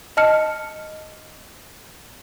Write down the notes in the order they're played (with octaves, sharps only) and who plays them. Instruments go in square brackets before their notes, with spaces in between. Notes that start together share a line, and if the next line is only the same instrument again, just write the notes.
[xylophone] D#5 A5 F6 C#7